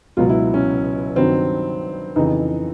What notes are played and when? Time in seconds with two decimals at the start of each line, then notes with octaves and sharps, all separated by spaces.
0.17 C#2 B2 F#3 F4
0.29 E4
0.54 C#4
1.16 G2 D#3 F#3 C4
2.16 F2 C#3 E3 D#4